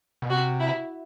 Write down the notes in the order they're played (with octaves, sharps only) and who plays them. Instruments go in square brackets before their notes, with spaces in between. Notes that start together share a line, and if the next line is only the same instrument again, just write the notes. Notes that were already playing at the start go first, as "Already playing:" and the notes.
[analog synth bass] B2
[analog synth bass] C3 [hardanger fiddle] F#4
[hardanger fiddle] E4